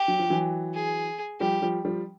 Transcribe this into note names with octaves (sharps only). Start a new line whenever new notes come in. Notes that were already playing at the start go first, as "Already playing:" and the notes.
Already playing: G4
F#3
F3
E3 F#3
G#4
F3 G3 G4
F3 G3
F3 G3